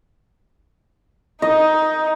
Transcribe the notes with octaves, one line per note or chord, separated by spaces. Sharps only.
D#4 D#5